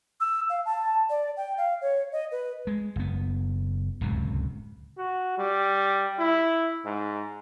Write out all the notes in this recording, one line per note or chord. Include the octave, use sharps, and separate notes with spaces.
E6
F5
A5
D5
G5
F5
C#5
D#5
B4
G#3
F#1 B3
D1 C#2 F#2 C3
F#4
G3
E4
G#2